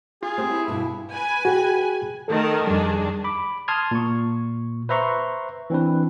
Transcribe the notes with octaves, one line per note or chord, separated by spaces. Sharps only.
F4 G#4
C4 G4 C5
E4
G2 B2
B4 G#5
F#4 G#4 G5
D#3 A3 A4 A#4
F2 D#3 G3 D4 G#4
B5 D6
A5 C6 D#6 F6 G#6
A#2 C#6
B4 C5 E5 A#5 C6 C#6
E3 C4 D4 B4